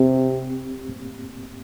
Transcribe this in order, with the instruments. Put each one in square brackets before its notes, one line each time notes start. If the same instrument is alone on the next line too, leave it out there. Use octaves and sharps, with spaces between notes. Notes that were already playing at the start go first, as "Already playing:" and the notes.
Already playing: [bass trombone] C3 [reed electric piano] C4 G4